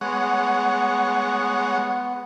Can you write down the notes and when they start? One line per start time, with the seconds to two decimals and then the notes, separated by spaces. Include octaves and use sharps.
0.01 G#3 B3 C#5 F#5